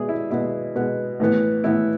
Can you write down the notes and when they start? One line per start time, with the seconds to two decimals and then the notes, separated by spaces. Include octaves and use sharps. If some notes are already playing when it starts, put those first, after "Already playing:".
Already playing: B2 G#3 B3 G#4 D5 E5
0.09 E4
0.31 B2 G#3 B3 E4
0.75 B2 G#3 B3
1.20 A2 E3 B3
1.64 A2 E3 B3 E4